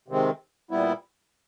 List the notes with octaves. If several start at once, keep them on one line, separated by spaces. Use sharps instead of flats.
C3 D#3 G#3 C4
A#2 G3 B3 E4